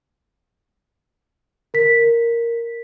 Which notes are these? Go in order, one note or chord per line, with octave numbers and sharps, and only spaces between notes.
A#4 B6